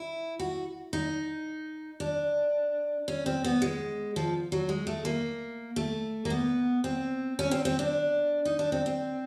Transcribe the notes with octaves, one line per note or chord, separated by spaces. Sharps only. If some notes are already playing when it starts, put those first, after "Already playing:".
Already playing: E4
F#4
D#4
D4
C#4
C4
B3
G#3
F3
F#3
G#3
A3
A#3
A3
A#3
B3
C4
C#4
C4
C4
D4
D#4
D4
C4
C4